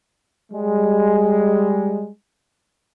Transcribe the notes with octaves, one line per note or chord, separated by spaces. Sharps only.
G3 G#3